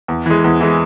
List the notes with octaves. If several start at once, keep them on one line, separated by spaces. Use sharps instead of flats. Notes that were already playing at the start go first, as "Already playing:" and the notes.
E2
E3 G#3
E2
E3 G#3